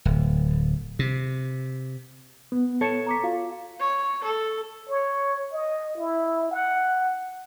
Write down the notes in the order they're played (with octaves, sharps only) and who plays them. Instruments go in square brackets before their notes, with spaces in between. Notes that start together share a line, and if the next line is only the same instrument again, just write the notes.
[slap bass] D1
C3
[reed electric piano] B3
[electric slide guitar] A4 C#5 [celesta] A5 C#7 E7
[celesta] A#5 D6 B6
F4 F#4 F5
[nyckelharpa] C#5
A4
[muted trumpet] C#5
D#5
E4
F#5